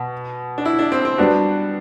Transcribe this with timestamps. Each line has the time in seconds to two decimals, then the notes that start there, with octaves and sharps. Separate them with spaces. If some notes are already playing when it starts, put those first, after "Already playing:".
Already playing: B2
0.58 D4
0.65 E4
0.79 D4
0.92 C4
1.05 C4
1.18 G3 B3 D4 F#4